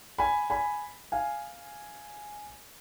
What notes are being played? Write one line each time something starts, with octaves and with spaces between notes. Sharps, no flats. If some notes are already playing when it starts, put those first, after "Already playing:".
G#5 B5
G#5 B5
F5 G#5